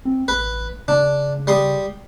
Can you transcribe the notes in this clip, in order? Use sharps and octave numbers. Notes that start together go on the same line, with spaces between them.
C4
A1 B4
C#3 D4
G3 C6 D#6